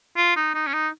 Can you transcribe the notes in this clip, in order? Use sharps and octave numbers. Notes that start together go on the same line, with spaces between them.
F4
D#4
D#4
C#4
D#4